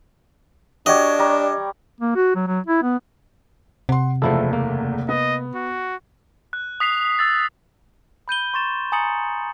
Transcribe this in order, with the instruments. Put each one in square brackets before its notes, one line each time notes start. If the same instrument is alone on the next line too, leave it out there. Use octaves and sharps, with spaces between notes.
[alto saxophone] D4 [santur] F#4 G4 C#5 [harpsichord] D#5
[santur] G3 A#5
[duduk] A#3
F#4
F#3
F#3
E4
B3
[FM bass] C3 [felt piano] F#5 C6
[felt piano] F#1 E2 A3 [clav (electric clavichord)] F3 E4 A4
[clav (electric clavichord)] A#3
[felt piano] B3 [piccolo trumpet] D#5
[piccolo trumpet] F#4
[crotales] F#6
D#6 B6 C7 F7
E6 A6
[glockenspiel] B5 G6 D#7 G7
C6 C#6 A6 E7
G#5 A#5 D#6 A6 C#7 F#7